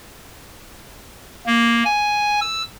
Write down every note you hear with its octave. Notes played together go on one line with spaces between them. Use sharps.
A#3
G#5
E6